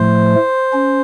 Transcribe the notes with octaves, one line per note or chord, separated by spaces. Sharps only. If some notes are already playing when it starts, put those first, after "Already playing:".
Already playing: A2 F3 A3 C5
C#4